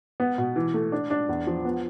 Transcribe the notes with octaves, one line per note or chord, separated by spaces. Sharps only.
B3
B2
E3
A3
D4
D4
E2
F3
B3